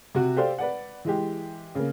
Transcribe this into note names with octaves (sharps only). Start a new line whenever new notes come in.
C3 F#4
G4 A4 C5 D5 F5
B4 D5 F#5
E3 G#3 G4
C#3 A#3